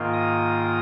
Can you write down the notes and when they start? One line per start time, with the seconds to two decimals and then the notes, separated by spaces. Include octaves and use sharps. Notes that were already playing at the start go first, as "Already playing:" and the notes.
Already playing: G#2 D#3 A#3 F4
0.13 D#6